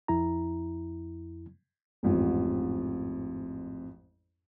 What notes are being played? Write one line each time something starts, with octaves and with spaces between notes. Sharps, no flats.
F2 E4 A#5
A1 F2 G#2